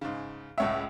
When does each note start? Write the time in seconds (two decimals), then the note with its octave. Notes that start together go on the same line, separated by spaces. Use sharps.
0.01 G#2 C#3
0.58 C#2 A2 C#5 E5 F#5